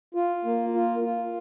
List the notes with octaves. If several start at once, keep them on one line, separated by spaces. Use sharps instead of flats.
F4
A#3
F4
F4